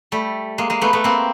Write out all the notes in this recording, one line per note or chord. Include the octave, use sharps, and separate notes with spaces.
G3 A3
G#3 A#3
G#3 A#3
A3 B3
A3 B3
A#3 C4